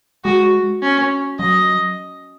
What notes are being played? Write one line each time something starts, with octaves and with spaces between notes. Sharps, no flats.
G#3 F#4
C#4
F#3 D#5